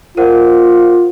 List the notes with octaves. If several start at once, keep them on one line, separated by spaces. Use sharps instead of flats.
F4 A#4 C5 F#5